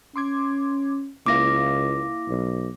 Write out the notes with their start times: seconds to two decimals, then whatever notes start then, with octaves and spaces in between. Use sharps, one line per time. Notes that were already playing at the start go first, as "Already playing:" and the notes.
0.16 C#4 C6 D6 G#6
1.26 C#2 A#3 E4 F5 D6 A#6
2.29 B1